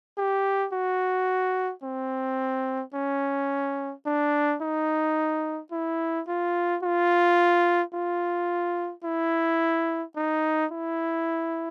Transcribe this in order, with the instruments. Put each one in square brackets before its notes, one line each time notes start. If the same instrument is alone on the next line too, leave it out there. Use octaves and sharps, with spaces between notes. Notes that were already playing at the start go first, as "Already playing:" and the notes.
[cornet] G4
F#4
C4
C#4
D4
D#4
E4
F4
F4
F4
E4
D#4
E4